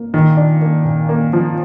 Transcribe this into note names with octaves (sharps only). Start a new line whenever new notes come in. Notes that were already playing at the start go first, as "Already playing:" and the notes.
Already playing: A#3
A#2 D#3
D4
A#3
A#2
A#3
F3